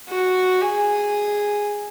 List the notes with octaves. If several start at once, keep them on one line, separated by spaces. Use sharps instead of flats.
F#4
G#4